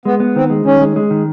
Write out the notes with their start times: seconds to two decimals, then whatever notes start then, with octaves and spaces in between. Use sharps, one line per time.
0.05 G#3 B3
0.20 B3
0.35 D#3 C4
0.50 G#3
0.65 D#3 C#4
0.81 G#3
0.96 G#3
1.10 D#3